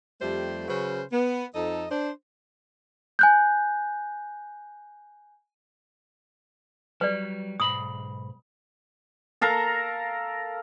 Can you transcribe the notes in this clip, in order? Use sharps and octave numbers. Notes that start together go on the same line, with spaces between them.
F2 G3 A3 G4 C5
C#3 F#3 C#4 B4 C5
B3
F2 D#4 A4 D#5
D4 C5
G#5 F#6 G6
F#3 G3 B4 D5
B1 G#2 B5 D#6
A4 A#4 F5 A#5